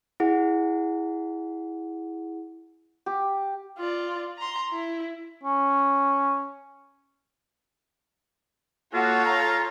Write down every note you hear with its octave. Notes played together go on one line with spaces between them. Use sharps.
E4 G#4 F#5
G4
F4 D5
A#5 C6
E4
C#4
A#3 F4 F#4 A4 C#5
F5 A#5